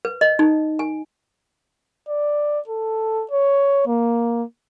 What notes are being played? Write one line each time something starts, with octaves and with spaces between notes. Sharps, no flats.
B4
D#5
D#4
G#5
D5
A4
C#5
A#3